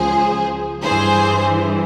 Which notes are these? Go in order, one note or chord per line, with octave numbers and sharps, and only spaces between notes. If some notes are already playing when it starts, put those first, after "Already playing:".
Already playing: C#2 C#3 F3 G#4 C5
G2 E3 G#4 C5